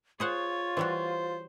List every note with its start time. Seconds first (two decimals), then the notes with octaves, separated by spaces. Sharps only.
0.20 F4 G#4 C5 C#5 F#5
0.77 E3 G3 F#4 C5